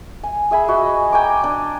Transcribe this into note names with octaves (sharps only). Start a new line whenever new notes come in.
G#5
G#4 E5 G#5 B5
F#4 D#5
G5 G#5 A#5 D6
D4 G#5